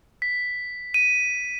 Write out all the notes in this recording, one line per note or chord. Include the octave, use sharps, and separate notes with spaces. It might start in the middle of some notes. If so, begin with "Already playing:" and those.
B6
D#7